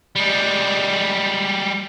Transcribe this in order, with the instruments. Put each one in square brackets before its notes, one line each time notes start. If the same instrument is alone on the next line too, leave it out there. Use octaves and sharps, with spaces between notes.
[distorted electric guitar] G3 G#3